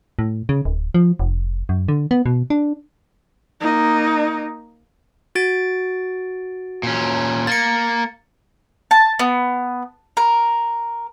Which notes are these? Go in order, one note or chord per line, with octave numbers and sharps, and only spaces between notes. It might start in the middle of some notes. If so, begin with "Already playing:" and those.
A2
C#3
D1
F3
F1
F#2
D3
B3
B2
D4
A#3 D#4
F#4 A6 D7
A#2 C#4
A#3 A6 C#7
A5
B3
A#4